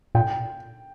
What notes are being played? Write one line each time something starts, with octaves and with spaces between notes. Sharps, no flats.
A#2 G5